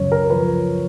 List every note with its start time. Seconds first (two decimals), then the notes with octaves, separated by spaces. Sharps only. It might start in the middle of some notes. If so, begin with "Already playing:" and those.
Already playing: F#2 C#3 C#5
0.12 A#4
0.30 F3 B4